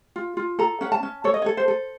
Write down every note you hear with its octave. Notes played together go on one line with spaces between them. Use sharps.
F4
F4
A4 A#5
C#4 F#5
A5
C#4
A4 C#5
D#5
A4 C#5
C5
A4